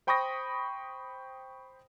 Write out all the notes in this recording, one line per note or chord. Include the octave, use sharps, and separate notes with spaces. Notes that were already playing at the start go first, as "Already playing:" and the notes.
C5 G5 B5 C#6 D#6 A#6